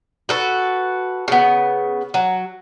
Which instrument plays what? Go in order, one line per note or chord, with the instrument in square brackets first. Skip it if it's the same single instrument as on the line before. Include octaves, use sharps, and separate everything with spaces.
[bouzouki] F#4 A4 B4
C#3 B3
F#3